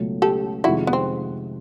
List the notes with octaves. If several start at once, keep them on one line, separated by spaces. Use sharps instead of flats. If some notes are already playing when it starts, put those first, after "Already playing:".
Already playing: C#2 B2 F#3 A3 C#4
G4 A4
F2 C3 D#3 G#3 E4 F#4
B3
C4